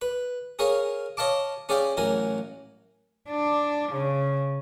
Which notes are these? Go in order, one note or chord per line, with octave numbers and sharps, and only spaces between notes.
B4
G#4 A#4 C#5 F5 G#5
C#5 D#5 F5 A5 D6
C#4 G#4 D5 F5 G5
A1 F#3 A#4 G#5
D4
C#3